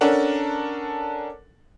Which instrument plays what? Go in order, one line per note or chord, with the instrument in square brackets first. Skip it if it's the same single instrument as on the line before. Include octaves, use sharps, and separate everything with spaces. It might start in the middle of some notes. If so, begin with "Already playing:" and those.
[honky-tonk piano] C#4 D4 A4 A#4 F#5